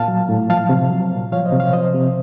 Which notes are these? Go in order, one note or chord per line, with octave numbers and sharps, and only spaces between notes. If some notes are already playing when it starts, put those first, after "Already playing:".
Already playing: A#2 F5 A5
F#3
A2
F3 F5 A5
C3
F#3
A#2
F3 C#5 F5
C5 D#5
C3
C#5 F5
F3 C5 D#5
C3